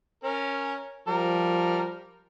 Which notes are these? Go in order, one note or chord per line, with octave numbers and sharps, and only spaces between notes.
C#4 A#4
F3 G3 A#4